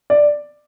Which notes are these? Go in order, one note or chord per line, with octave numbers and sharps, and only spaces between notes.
D5